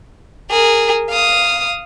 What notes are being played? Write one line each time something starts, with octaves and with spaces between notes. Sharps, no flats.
G#4 A#4
F5 D#6